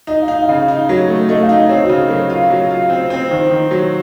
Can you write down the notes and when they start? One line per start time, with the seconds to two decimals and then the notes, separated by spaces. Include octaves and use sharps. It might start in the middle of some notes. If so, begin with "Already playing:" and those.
0.07 D#4 D#5
0.22 F5
0.28 D#4
0.35 D#5
0.42 F5
0.48 C#3 D#5
0.68 D#4
0.89 F#3
1.08 A3
1.29 A3 D#5
1.42 F5
1.49 D#4
1.56 D#5
1.69 C4 C#5
1.83 F#4
1.89 C#3
1.96 A4
2.10 F#3 A#4
2.30 F4
2.50 F#3
2.71 F4
2.90 C4
3.10 C4
3.31 D#3 C5
3.51 D#3
3.71 F#3